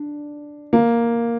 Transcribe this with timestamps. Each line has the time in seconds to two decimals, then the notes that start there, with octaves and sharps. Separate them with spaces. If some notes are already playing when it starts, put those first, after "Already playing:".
Already playing: D4
0.73 A#3